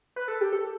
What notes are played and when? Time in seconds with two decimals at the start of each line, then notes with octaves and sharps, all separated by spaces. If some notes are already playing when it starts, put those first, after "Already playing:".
0.16 B4
0.28 A4
0.41 G4
0.53 A4